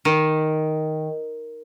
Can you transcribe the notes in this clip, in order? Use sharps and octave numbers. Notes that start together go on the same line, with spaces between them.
D#3